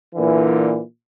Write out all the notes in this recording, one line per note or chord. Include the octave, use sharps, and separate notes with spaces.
A#2 D3 E3